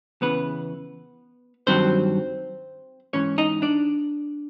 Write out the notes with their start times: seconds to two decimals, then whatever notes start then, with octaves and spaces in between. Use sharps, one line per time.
0.21 E2 C#3 E3 B3 B4
1.67 G2 D#3 F#3 C4 C5
3.13 G#2 E3 C#4 C#5
3.38 D#4 D#5
3.62 D4 D5